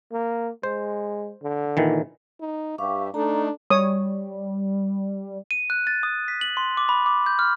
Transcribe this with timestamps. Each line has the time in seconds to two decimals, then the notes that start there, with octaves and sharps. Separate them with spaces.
0.13 A#3
0.63 G#3 C5
1.43 D3
1.77 A#2 D#3 E3
2.41 D#4
2.78 G2 G4 E5 F5 C#6 D6
3.14 A3 D4 D#4 A4 A#5
3.70 G3 C#5 D#6
5.51 D#7
5.70 F#6
5.87 A6
6.03 D#6
6.28 B6
6.41 F#7
6.57 C6
6.77 D6
6.89 B5
7.06 D6
7.26 G6
7.39 F6